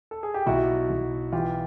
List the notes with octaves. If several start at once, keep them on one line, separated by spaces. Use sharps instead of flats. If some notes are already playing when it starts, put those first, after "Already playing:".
A4
G#4
G4
B1 E4 F#4
B1
E3 F4 G4